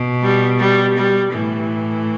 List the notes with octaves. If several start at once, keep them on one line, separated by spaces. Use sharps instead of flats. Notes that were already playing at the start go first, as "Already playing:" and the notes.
Already playing: B2
G3
G3
G3
A2 E3